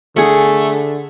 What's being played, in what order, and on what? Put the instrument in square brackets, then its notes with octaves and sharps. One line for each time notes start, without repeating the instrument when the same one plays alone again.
[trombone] D3 [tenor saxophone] A3 [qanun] G#4 F#5